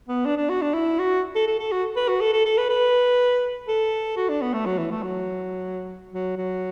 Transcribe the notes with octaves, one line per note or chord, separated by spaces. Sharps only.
B3
D4
D4
F#4
D4
E4
F#4
A4
A4
A4
F#4
B4
F#4
A4
A4
A4
B4
B4
A4
F#4
D4
B3
A3
F#3
E3
A3
F#3
F#3
F#3